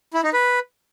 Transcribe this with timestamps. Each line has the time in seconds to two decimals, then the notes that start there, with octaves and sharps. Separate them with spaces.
0.14 E4
0.23 D#4
0.33 B4